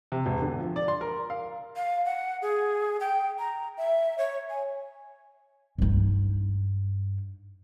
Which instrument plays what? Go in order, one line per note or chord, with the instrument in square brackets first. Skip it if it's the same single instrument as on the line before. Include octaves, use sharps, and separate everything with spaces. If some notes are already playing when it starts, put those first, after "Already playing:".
[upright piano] C3
E1
D3
F3
D5
C6
A#4
F5
[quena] F5
F#5
G#4
G5
A#5
E5
C#5
G#5
[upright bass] G2 D#4